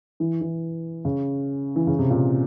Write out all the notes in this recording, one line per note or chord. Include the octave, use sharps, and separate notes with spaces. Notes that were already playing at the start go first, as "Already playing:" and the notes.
E3
E3
C#3
E3
C#3
C3
A#2